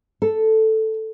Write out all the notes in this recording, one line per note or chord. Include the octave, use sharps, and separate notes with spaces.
A4